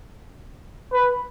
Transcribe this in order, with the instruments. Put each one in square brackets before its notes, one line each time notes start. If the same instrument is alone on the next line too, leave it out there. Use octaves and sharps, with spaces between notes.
[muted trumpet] B4